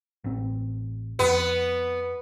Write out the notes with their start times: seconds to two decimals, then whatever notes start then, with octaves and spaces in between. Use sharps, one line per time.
0.24 A1 C4
1.19 F2 B3